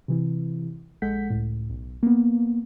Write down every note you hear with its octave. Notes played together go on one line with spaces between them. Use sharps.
C3 E3 E4
A#1 G#3 A4 F#5 G6 B6
C#2 A2
B1
A#3 B3